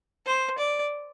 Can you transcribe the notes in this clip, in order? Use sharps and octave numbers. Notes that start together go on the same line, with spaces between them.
C5
D5